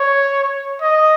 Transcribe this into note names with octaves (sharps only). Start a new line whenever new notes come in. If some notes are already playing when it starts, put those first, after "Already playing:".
Already playing: C#5
D#5